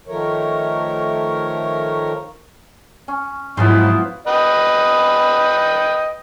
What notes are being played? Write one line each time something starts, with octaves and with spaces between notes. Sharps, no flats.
D#3 F3 A3 A#4 C#5
C#4
G#2 F3 F#3 B3 E4 F4 C5
B4 D#5 G5